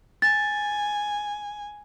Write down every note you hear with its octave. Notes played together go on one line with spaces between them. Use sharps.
G#5 A6